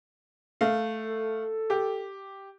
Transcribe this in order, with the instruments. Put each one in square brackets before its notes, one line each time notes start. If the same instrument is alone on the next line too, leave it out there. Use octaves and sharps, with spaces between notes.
[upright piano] A3 F5
[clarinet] A4
[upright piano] G4